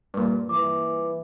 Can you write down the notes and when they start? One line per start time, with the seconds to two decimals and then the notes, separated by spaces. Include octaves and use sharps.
0.14 G2 A#2
0.49 E3 D6